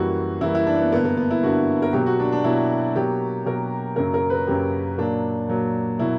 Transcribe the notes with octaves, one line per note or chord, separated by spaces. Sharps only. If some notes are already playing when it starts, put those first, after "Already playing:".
Already playing: F#2 E3 G3 A#3 F#4
F#2 E3 G3 A#3 E4
E4
D4
B3
G2 D3 A#3 B3
A#3
B3
E4
G2 D3 A#3 F#4
A#4
B2 F#3 A#3 G4
F#4
D4
D4
B2 F#3 A#3 E4
B2 F#3 A#3 G4
B2 F#3 A#3 A#4
F#2 C#3 F#3 A#3 A#4
A#4
B4
F#2 C#3 F#3 A#3 G4
A#2 F#3 A#3 D4
A#2 F#3 A#3
B2 F#3 A#3 E4